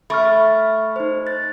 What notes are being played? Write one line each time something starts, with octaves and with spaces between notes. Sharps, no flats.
A3 B5 C#6 F6
D#4 C5
F#6 A6